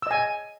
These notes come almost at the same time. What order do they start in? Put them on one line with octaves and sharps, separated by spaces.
E6 D#5 G#5